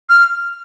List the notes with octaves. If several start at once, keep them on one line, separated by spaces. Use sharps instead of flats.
F6